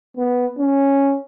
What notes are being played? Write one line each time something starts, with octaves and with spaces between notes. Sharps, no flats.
B3
C#4